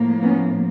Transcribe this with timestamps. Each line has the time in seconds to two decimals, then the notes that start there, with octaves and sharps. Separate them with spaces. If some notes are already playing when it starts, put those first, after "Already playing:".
Already playing: A2 F3 A#3
0.22 B3 C#4